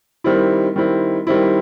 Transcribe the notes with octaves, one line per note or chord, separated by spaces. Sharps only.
D#3 G3 C4 E4
D#3 G3 C4 E4
D#3 G3 C4 E4